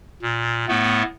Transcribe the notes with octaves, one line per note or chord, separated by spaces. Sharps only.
A#2
A2 A3 B3